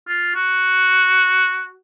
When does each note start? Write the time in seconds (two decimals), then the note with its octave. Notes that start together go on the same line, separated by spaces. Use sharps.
0.08 F4
0.35 F#4